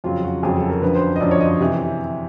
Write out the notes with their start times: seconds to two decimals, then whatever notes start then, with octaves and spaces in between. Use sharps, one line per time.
0.04 F2 C#3 F#3 F4
0.24 F#4
0.43 F2 C#3 F#3 G#4
0.56 A4
0.69 A#4
0.82 F#2 D3 F3 B4
0.95 C5
1.16 D#5
1.20 F#2 D3 F3 D5
1.31 C#5
1.40 D#5
1.61 C3 E3